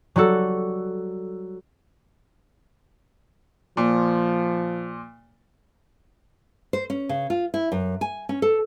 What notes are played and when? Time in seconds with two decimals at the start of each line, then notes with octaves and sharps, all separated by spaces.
0.16 F#3 G3 F#4 A4
3.77 A#2 F3
6.73 C5
6.90 C#4
7.09 C#3
7.30 F4
7.54 E4
7.72 F#2
8.01 G#5
8.29 C#4
8.42 A4